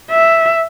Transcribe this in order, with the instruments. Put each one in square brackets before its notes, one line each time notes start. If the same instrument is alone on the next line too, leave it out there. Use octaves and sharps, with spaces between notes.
[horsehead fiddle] E5